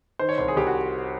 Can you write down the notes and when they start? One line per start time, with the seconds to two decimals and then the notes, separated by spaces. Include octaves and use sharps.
0.19 D#3 C5
0.29 C#5
0.38 C2 C5
0.48 G#4
0.56 C2 G4
0.67 F#4